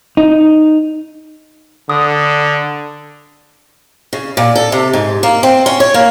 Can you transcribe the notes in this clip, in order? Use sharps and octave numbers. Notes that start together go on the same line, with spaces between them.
D#4
D3 D#6
C#3
A#2
A4
C3
G#2
A#3
C4
C#4
C#5
A#3